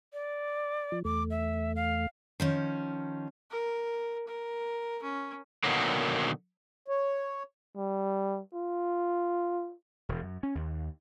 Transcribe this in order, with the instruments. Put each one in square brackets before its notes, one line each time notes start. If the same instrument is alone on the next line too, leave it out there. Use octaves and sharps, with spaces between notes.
[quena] D5
[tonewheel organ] F3
[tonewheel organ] E2 A3 [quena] D6
[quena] E5
F5
[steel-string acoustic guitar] D#3 F3 C#4
[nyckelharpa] A#4
A#4
C#4
[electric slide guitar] B2 D3 D#3 F#3 A#3
[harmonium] C#5
[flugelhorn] G3
F4
[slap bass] E1
F#2
C#4
D#2